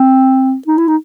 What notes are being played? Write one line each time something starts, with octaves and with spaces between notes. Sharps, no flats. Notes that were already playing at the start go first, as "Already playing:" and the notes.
Already playing: C4
D#4
E4
D#4